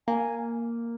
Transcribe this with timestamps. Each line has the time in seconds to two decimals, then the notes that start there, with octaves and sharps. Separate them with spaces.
0.08 A#3 G#5